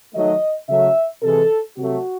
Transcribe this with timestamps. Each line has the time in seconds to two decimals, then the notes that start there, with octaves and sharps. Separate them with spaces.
0.14 D#3 F#3 A3 D#5
0.69 C#3 F#3 A3 E5
1.23 C3 E3 G#3 A4
1.77 C3 F#3 A3 F#4